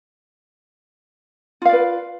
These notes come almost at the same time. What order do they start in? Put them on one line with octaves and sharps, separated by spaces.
F4 F5 D5 B4